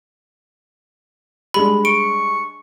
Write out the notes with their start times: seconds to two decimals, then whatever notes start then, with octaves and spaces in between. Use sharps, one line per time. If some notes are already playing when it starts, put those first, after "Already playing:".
1.54 G3 G#3 D4 B5
1.85 C#6 D7